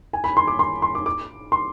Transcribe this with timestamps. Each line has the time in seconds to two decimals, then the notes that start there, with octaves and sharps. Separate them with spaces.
0.13 G#5
0.24 B5
0.37 C6
0.48 D6
0.59 C6
0.82 C6
0.95 D6
1.06 D6
1.52 C6